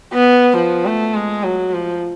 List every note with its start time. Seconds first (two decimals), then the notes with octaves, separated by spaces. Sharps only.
0.13 B3
0.57 F3
0.86 A3
1.15 G#3
1.44 F#3
1.73 F3